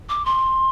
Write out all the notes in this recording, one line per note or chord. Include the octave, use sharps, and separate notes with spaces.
D6
C6